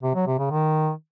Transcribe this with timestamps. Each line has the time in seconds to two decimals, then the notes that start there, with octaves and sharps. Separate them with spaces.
0.03 C3
0.15 F#3
0.27 C3
0.39 C#3
0.51 D#3